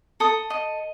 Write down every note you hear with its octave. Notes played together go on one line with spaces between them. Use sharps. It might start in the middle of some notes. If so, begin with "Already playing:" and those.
A4 D#6
D#5